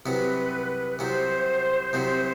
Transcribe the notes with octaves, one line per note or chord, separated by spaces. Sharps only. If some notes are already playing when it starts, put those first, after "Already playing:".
C2 C3 F#3 B4
C2 C3 F#3 C5
C2 C3 F#3